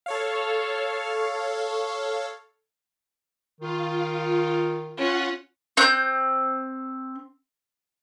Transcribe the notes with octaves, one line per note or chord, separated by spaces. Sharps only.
A4 C#5 F5
D#3 F4
C#4 F4 F#5
C4 F#6 G6